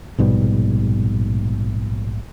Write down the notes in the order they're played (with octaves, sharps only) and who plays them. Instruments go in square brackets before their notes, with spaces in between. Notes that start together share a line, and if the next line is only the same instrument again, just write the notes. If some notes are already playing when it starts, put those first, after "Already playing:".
[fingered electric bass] A#1 G#2 B2 G3